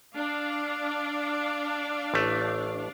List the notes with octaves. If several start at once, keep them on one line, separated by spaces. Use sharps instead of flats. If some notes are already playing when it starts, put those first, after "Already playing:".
D4 D5 F5
A1 A3